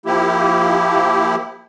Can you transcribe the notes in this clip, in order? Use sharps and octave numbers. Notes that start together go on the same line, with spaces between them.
F3 A#3 E4 G4